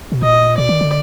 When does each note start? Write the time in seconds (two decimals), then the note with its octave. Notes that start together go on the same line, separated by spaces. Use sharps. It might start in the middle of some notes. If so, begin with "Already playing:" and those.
0.12 B2
0.22 A#2 D#5
0.57 B2 D5
0.69 D#3
0.81 D3